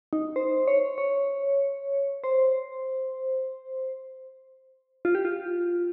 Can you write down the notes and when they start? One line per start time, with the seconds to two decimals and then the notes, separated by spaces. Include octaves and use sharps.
0.13 D#4
0.36 C5
0.68 C#5
0.98 C#5
2.24 C5
5.05 F4
5.15 G4
5.25 F4